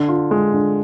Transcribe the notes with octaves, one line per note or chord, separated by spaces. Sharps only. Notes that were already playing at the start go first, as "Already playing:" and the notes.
Already playing: D3
F4
G#3
D3